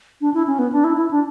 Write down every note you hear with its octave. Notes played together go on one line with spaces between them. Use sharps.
D4
E4
C#4
B3
D4
E4
E4
D4